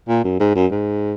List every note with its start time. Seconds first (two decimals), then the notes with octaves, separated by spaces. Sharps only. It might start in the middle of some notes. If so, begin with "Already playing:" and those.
0.08 A#2
0.24 F#2
0.40 G#2
0.55 F#2
0.71 G#2